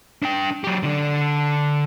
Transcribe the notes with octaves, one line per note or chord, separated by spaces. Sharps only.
D4 G5
F#3 G4
D3 D4